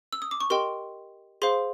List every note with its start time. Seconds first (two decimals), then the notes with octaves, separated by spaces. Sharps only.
0.13 E6
0.22 D#6
0.31 D6
0.40 C#6
0.50 G4 A#4 D#5 G5 C6
1.42 G#4 C5 F5 C6